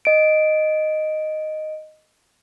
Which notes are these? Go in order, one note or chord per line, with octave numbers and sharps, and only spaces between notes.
D#5 D7